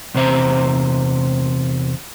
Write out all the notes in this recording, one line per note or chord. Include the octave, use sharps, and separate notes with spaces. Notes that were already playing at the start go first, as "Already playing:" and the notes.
E2 C3 C4 C5 E5 A#5